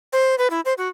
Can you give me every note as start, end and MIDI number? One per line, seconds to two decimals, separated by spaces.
0.13 0.35 72
0.38 0.48 71
0.50 0.61 64
0.65 0.73 72
0.78 0.88 66